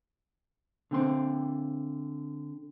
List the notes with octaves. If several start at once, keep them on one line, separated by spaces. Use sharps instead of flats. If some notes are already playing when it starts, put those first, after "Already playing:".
D3 C4 C6